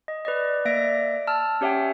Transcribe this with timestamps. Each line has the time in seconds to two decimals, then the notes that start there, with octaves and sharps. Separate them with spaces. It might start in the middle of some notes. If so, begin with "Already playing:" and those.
0.08 D#5
0.25 B4 D5 D#5
0.65 A#3 D5 E5 A#6 D7
1.27 A5 E6 F6
1.61 C#4 G4 C#5 E5 F#5 G5